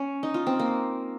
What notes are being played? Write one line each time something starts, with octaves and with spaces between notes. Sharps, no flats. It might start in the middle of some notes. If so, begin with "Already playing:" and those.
Already playing: C#4
D#4
F4
C4
A#3